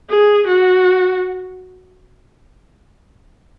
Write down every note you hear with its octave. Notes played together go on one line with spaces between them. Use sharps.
G#4
F#4